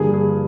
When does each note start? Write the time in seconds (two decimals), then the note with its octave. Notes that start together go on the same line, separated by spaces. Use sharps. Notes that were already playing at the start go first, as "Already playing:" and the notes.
Already playing: G2 D3 F3 A#3 G#4
0.14 G#4